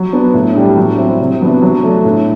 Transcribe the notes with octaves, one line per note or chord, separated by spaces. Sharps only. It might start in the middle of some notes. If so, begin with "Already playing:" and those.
Already playing: F#3
B3 D4
A2
G3 D4
F#3
C4 E4
C3
F#3 B3 D4
F#3
A3 D4
A2